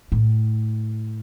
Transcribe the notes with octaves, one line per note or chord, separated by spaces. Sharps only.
A2